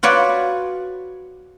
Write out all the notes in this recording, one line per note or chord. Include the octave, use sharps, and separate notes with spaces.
F4 F#4 B4 C#5 D5